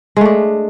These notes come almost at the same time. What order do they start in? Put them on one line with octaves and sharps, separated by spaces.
G#3 A3 D4